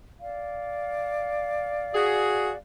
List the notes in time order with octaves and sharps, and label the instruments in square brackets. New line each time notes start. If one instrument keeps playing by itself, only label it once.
[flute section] D5 F5
[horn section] F#4 G#4